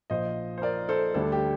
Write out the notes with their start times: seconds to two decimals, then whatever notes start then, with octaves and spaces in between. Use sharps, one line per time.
0.10 A#1 A#2 F3 C5 D#5
0.58 C5
0.62 A#4 D5
0.89 A4 C5
1.14 D2 D3 G3 D4 A4
1.32 G4